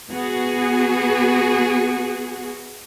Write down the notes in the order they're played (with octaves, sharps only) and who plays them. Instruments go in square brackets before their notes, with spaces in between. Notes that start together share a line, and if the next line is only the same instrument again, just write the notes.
[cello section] B3 F#4 G#4